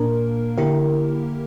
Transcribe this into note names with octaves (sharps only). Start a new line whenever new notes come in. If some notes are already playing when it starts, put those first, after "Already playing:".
Already playing: A#2 A#3 D4 A#4
D3 A#3 E4 G4 A#4